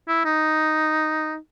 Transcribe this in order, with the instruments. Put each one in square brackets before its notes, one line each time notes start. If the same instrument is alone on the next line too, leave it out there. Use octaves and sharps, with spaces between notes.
[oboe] E4
D#4